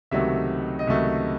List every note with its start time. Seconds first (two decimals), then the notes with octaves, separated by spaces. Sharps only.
0.11 C#2 C3 D#3 F#3 A3 E5
0.79 D#5
0.87 C#2 C3 D#3 F#3 A3 E5